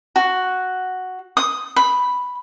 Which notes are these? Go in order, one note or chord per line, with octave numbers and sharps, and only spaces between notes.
F#4
D#6
B5